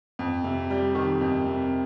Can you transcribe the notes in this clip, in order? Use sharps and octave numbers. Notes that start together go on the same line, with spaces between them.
F2
C3
G3
D#3
F2
C3